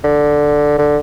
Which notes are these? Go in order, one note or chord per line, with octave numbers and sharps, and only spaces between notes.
D3
D3